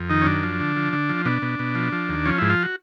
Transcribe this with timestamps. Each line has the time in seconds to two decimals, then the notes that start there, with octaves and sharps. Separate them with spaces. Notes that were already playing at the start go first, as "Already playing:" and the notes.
Already playing: F2
0.10 D#3 D#4
0.21 C#4
0.26 F#2 D4
0.43 F3
0.60 D3
0.76 F3
0.93 D3
1.09 F3
1.25 B2 D4
1.42 B2
1.59 B2
1.75 F3
1.92 F3
2.09 D#2
2.25 F3 C#4
2.38 G#2 E4
2.50 F4
2.63 F#4